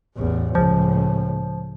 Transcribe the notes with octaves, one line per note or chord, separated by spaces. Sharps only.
A1 E2
C#2 A2 F3